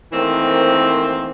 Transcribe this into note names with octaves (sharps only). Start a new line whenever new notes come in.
D#3 E3 A3 A#3 C4